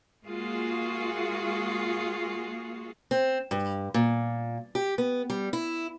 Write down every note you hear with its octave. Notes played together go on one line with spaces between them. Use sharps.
G#3 A#3 F4 F#4 G#4
C4
G2
A#2
G4
B3
G3
E4